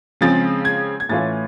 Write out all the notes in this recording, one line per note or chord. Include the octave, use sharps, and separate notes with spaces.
C#3 F3 G#3 C4 A6
G#6
G#6
A2 E3 A3 C#4 F4 A6